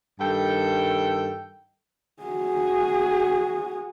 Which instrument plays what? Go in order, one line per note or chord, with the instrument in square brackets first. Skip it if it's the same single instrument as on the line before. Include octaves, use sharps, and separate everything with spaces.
[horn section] G2 D#3 A4 G5
[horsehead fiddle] F#4 G#4